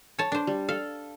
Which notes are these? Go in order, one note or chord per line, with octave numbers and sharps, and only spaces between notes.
C#5 A5
D4 C5
G3
A4 F5